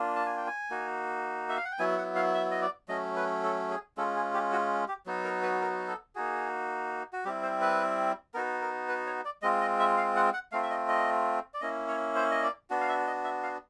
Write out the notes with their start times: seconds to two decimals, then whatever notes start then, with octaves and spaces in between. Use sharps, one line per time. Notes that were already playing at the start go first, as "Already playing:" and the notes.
Already playing: A#3 D4 F4
0.16 A5
0.26 G#5
0.37 G5
0.47 G#5
0.70 A#3 D#4 F#4
1.49 E5
1.57 F5
1.65 F#5
1.72 G5
1.79 F#3 B3 E4 G#5
1.98 F#5
2.16 F5
2.34 E5
2.51 D#5
2.62 D5
2.89 F#3 A3 C#4 D#5
3.16 B4
3.43 A4
3.70 G#4
3.97 G#3 C#4 F4 A4
4.16 G#4
4.34 G4
4.52 F#4
4.88 G4
5.06 F#3 B3 D#4 F#4
5.25 A#4
5.43 B4
5.61 A#4
5.88 A4
6.15 A#3 D#4 F#4 G#4
7.13 F#4
7.25 G3 C4 E4 G4
7.43 C5
7.61 B4
8.34 B3 D#4 F#4 A#4
8.62 A#4
8.88 B4
9.07 C#5
9.25 D5
9.42 G#3 C4 F4 D#5
9.61 D#5
9.79 E5
9.97 F5
10.16 F#5
10.34 F#5
10.52 A3 C4 F4 F5
10.63 E5
10.70 D#5
10.88 D#5
11.54 D5
11.61 A#3 C#4 E4 D#5
11.88 C#5
12.16 C5
12.31 D#5
12.43 D5
12.70 B3 D4 F#4
12.81 F5
12.89 E5
13.07 D#5
13.24 E5
13.43 F5